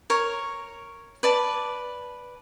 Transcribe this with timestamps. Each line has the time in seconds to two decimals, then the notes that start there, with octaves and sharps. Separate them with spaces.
0.10 A#4 C#5
1.23 B4 D5 A5